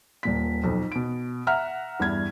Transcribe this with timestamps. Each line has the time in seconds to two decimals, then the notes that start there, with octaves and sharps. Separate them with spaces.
0.23 D#1 A#2 B6
0.64 B1 F2
0.92 B2 D7
1.47 E5 F#5 A#5 F6
2.00 E2 G2 G#6